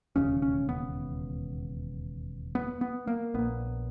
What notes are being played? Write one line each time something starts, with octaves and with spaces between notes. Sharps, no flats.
E1 D#2 C#3 C#4
C#4
B3
B3
B3
A#3
A#1 A#2 B3